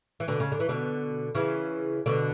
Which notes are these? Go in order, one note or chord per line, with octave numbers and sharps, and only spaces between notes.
E3
B2 D3
C#3
D3
E3
B2 D3
C#3 E3
B2 D3